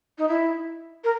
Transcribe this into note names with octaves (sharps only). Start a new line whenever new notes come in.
D#4
E4
A#4